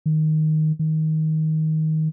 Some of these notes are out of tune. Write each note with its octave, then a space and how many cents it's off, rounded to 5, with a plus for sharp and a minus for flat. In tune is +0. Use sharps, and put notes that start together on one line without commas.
D#3 +0
D#3 +15